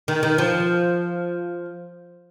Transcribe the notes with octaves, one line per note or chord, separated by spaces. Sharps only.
D#3
D#3
F3